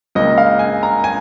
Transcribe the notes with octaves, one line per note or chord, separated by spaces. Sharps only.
C#2 C#3 A#3 D#5
F5
G#5
A#5
G#5